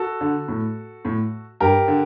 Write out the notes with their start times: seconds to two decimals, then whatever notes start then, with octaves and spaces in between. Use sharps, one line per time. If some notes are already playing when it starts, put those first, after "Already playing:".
Already playing: F#4 A4
0.21 D3
0.48 A2
1.05 A2
1.60 G2 G4 A#4
1.88 D3